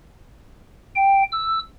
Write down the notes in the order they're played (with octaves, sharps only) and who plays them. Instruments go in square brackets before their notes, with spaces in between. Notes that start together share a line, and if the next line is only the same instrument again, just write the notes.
[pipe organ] G5
E6